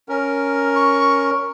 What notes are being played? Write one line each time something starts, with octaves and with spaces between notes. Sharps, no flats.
C#4 A#4
C#6